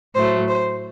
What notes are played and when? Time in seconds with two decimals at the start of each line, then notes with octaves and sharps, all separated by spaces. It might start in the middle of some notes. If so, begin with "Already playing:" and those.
0.15 A2 F#3 A3 C5
0.48 C5